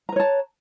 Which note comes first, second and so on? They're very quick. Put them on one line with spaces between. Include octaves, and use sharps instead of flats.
A#5 B4 C#5 A5